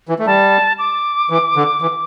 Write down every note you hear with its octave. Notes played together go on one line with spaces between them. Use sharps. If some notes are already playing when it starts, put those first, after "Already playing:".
E3
A3
G3 A5
D6
E3
D3
E3